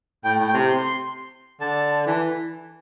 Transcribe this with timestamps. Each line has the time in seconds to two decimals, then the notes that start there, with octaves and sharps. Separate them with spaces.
0.24 A2 G5
0.40 A2
0.47 G5
0.54 C3
0.70 C6
1.60 D3 A5
2.07 E3